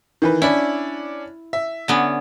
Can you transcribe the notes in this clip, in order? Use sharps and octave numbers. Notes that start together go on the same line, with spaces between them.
D#3 E3 B4
C#4 D4 E4
E5
D3 B3 C#4